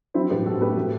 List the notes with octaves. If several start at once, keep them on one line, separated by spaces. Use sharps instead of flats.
F#3 C4 E4
A2 G4 B4
A2 F#4 A4
A3 G4 B4
A2